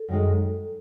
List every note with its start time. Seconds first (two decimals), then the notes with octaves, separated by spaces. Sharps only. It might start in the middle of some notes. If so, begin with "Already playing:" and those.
Already playing: A4
0.08 F#2 D#3 G#3